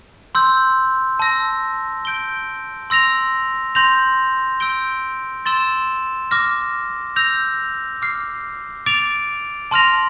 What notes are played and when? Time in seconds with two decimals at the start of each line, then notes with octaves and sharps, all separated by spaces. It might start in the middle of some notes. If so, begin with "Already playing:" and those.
0.35 C6 E6 G6
1.19 A5 E6 A#6
2.05 G6 D7 G7
2.90 C6 E6 A#6 F7
3.75 C6 G6 A#6 F7
4.60 E6 G6 D7 G7
5.46 C6 E6 A6 E7 G7
6.31 D6 F6 A#6
7.16 E6 G6 A#6 F7
8.02 D6 F6 C7
8.86 D6 A6 D7 F7
9.71 A5 C6 F6 A#6 F7